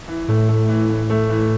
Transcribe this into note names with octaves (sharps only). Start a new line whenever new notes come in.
E3
A2 A3
A3
E3
E3
A3
E3